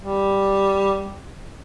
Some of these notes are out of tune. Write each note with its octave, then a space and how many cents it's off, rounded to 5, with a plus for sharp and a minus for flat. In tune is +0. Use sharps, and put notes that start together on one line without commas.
G3 +0